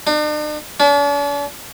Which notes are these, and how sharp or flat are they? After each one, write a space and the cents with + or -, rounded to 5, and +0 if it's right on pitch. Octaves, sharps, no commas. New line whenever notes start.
D4 +45
D4 -45